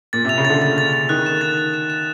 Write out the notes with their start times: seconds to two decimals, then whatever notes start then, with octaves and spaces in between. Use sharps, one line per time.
0.13 A#2 A6
0.25 C3 F7
0.38 C#3
0.45 D3 A6
0.62 A6
0.78 A6
0.93 A6
1.09 D#3 F#6
1.26 E7
1.41 A6
1.58 E7
1.74 E7
1.90 E7